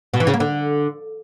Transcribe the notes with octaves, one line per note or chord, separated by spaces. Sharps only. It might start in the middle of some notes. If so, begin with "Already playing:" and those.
B2
E3
C#3
A#3
D3